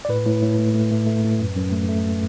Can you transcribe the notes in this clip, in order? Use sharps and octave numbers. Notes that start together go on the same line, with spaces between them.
D5
A2 B4
A2
A2
A3
A3
A3
A3
A2
F#2
F#2
A3
A3